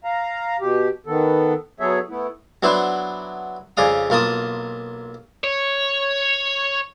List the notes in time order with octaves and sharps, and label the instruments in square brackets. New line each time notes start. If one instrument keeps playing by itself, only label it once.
[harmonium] F5 A#5
B2 G4
D#3 B3 A4
F#3 B3 G#4 A4 C#5 E5
A3 B3 E4
[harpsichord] F#3 B3 D4 E4 C5
F2 C#3 D5 F5 D#6
B1 A#3 F4 A5 D#6
[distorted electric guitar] C#5